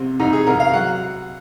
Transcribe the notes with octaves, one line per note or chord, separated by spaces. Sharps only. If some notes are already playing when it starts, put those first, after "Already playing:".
Already playing: C2 C3
C2 D#4
G#4
C2 A#4
F5
F#3 F#5